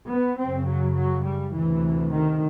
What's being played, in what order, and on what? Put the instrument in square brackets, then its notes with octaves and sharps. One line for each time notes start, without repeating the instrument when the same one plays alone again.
[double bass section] B3
F#2 C#3 C4
F#3
F#3
G3
D2 C3 E3
D#3